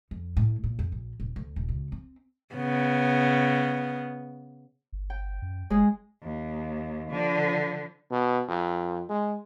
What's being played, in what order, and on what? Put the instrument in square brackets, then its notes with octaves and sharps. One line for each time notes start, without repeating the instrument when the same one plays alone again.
[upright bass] F2
A2
A#2
F2
A#1
D#1
D2
D#1
C#2
C4
[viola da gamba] C#3 B3
[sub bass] G1
[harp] G5
[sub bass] F#2
[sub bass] F#1 [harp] G#3 G#4
[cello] D#2
D3 F3
[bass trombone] B2
F2
G#3